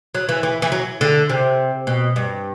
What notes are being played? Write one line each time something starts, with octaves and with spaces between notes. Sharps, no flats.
F#3
E3
E3
E3
F#3
D3
C3
B2
G2